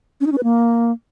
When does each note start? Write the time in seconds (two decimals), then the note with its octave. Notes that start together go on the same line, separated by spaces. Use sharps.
0.21 C#4
0.26 D#4
0.32 C#4
0.38 B4
0.43 A#3